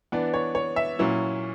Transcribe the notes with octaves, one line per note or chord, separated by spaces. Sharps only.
E3 B3 D4 D5
C#5
C#5
E5
A#2 F#3 C#4 E4